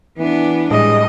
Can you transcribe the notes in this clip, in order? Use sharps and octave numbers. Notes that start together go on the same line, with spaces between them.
E3 B3 D4
A2 G3 G#3 D#5